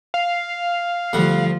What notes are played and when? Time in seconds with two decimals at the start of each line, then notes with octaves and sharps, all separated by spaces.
0.14 F5
1.13 D2 F3 G3 F#5